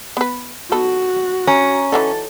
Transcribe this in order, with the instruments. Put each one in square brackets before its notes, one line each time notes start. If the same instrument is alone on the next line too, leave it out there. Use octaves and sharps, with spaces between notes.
[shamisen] B3 B4
[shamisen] B3 D#4 A4 [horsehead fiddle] F#4
[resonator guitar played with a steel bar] C#4 [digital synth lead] A#5
[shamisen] E3 F#3 D#4 [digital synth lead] A4